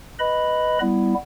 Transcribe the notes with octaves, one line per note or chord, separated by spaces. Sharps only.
B4 D#5 B5
G3 B3 E4